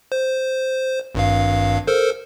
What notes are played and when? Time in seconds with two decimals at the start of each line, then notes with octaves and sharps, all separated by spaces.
0.12 C5
1.15 G#1 G2 F5
1.87 A4 A#4 C5